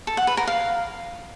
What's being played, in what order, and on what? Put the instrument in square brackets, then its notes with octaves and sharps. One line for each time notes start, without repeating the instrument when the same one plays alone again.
[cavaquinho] A4
F#5
B4
A#4
F5